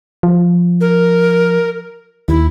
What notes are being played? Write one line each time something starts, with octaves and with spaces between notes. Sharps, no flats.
F3
A#4
D#2 E4